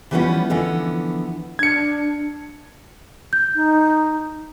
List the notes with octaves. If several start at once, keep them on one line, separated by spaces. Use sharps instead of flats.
E3 F3 G3 A#3 B3 C#4
D3 E3 F3 B3
D4 G#6 C#7
G6
D#4